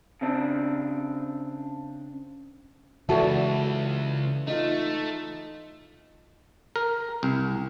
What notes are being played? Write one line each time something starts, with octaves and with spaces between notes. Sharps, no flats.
C#3 C4 D4
C#2 E3 E4 F#4 A4 B4 D5 A5
A3 D#4 F4
A#4
C2